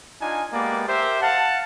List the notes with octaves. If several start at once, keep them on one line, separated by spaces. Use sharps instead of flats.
D4 D#4 F4 G#5
G#3 A#3 B3 G4 D5
G4 A#4 C5 E5
F5 F#5 A5